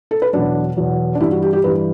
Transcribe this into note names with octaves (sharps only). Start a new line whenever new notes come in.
A4
B4
E2 B2 F#3 D4
E2 B2 F#3
D4
G2 E3 G3 E4
F#4
G4
G4
G2 E3 G3 B4